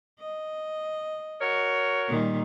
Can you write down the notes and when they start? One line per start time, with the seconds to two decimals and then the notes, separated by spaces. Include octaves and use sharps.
0.19 D#5
1.42 F#4 A#4 C#5
2.08 A#2 D#3 G3